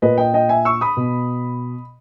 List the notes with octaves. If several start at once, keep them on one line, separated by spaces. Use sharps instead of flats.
A#2 B4 D#5
D#5 G5
D#5 G5
E5 G#5
C#6 E6
B5 D#6
B2